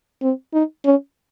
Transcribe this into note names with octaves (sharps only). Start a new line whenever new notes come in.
C4
D#4
C#4